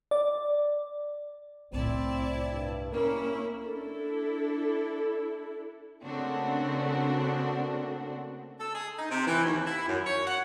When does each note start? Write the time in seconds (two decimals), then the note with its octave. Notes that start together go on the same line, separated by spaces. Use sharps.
0.11 D5
1.72 C2 A2 C4 E4 D5 A5
2.50 G2
2.93 A#3 C#4 E4 A#4
3.65 D4 E4 A4
6.04 C#3 A3 A#3 C4 D4 F#4
8.59 A4
8.73 G#4
8.98 D#4
9.10 C3
9.26 E3
9.44 D#2
9.66 E4
9.87 F#2
10.06 C#5
10.26 F#5